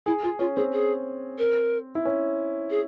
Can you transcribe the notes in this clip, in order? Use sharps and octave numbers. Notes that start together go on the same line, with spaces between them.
E4 G#4
F4 G#4
C#4 F4
C4 G#4
G#4
A#4
E4
C#4
G#4